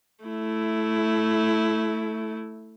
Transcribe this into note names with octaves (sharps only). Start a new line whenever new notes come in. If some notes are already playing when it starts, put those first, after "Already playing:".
A3 E4